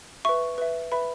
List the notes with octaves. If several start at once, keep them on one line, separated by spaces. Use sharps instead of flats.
B4 E5 C#6
B4 E5
B4 E5 B5